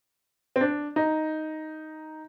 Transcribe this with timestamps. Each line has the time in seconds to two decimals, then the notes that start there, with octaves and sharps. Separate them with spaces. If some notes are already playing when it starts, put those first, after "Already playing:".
0.56 C4
0.61 D4
0.96 D#4